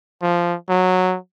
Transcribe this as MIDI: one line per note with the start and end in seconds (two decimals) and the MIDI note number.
0.22 0.55 53
0.69 1.16 54